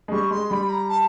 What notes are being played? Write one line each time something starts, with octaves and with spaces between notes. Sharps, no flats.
G#3
G3 C#6
G#3 C6
G3 B5
A#5
A5